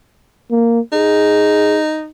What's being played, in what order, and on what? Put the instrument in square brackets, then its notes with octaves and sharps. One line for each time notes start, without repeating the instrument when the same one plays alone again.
[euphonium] A#3
[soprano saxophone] D#4 [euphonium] G#4